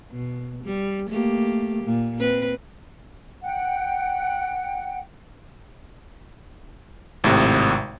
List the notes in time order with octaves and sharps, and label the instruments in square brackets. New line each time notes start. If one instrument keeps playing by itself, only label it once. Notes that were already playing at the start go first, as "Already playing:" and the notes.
[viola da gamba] B2
G3
A3 A#3 G4
A#2
C4 B4
[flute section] F#5 G5
[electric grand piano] G#1 A2 C3